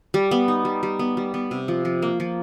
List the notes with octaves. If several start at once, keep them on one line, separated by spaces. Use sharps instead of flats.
G3
B3
D#4
G3
G3
B3
G3
B3
C3
F3
F3
A#3
F3